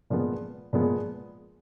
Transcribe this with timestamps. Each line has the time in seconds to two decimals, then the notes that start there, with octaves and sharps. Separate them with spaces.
0.10 A#2 F3 G#3 B3
0.73 A#2 F3 G#3 B3